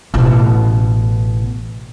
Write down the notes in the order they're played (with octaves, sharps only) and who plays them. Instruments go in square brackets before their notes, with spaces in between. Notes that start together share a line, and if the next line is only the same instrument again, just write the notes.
[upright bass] A1 B2